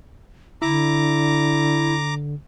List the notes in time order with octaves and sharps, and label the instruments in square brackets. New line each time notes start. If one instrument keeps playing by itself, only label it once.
[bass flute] D3 [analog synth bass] E4 [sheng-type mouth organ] A#5 D6